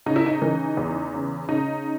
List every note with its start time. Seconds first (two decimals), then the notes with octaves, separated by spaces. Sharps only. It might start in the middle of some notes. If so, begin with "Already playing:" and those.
0.06 C#3 D#4
0.16 E4
0.26 D#4
0.42 E3
0.77 E2
1.14 C#3
1.49 C#3 D#4